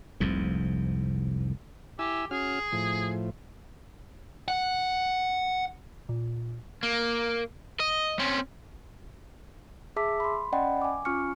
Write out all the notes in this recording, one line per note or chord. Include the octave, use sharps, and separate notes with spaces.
F1 C2 F2 G#2
E4 G4 G#5 E6
C#4 F#4 G#4 F6
A2 F3
F#5
A#2
A#3
D#5
C4 C#4
G#4 E5 A5 D6 E6 B6
B5 C6
C#4 D5 D#5 F#5 G5 B5
G#5 D6
C#4 F4 G#5 C#6 F6 C#7